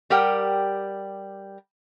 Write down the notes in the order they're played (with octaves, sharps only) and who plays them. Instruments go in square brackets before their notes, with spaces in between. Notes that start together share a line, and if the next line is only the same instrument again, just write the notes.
[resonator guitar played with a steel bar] G3 G4 A#4 F#5 G5